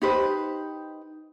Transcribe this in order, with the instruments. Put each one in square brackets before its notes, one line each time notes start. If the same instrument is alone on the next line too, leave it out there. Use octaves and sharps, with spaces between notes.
[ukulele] D#4 G4 B4 C5